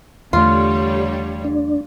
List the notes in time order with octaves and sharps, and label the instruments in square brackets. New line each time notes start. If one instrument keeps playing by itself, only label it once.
[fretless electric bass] E2 A3 [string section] D3 G3 C#5 [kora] F4
[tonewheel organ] D4